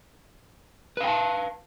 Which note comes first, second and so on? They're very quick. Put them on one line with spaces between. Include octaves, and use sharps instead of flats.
B4 F5 G5 A5